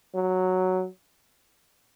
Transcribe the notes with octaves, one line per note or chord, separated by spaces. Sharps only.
F#3